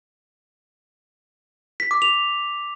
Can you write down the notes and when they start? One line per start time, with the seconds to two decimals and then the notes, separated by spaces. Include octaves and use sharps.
1.80 B6
1.91 D6
2.02 F7